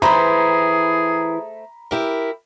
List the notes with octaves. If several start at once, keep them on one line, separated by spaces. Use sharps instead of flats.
E3 A3 E4 G#4 C5 A#5 B5
E4 G4 A#4